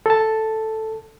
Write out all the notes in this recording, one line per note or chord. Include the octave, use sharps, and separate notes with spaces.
A4 A5